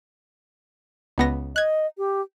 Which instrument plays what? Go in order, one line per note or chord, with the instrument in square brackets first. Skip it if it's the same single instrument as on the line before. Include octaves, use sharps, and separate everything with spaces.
[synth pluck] C#2 B3 A#6
[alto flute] D#5 [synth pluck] F#6 G#6
[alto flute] G4